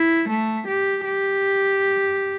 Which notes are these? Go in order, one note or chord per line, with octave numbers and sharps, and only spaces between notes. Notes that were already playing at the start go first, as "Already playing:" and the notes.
Already playing: E4
A3
G4
G4